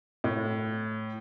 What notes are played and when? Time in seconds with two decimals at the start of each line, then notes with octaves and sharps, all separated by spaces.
0.24 A2